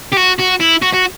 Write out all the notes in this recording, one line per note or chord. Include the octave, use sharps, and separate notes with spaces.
G4
F#4
F#4
E4
F#4
F#4